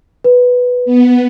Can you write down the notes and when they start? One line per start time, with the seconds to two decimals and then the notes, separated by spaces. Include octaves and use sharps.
0.24 B4
0.85 B3